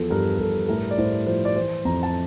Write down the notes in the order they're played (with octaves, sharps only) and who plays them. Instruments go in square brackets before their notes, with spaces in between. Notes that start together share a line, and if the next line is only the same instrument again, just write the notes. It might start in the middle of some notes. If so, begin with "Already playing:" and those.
Already playing: [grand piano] E2 F3 A4
G2 A#4
G2 A4
A2 A#4
D5
A2 C5
F3 C5
D5
E3 C5
F2 A#5
A5